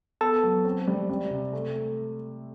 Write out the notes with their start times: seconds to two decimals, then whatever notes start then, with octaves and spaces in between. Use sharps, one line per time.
0.21 B3 A4 A5
0.43 F#3
0.65 C4
0.88 G3
1.09 G3
1.30 C3
1.53 A3
1.75 A3